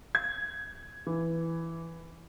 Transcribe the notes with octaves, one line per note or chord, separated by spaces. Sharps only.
G#6
E3